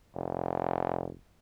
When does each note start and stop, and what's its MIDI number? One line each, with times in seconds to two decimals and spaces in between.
0.15 1.14 29